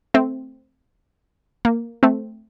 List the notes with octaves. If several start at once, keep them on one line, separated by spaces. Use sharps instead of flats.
A3 C4
A#3
A3 C4